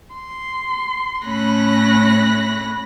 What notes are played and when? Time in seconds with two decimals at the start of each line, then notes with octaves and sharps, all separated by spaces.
0.13 C6
1.25 A2 A3 C#4 B5 F#6 A#6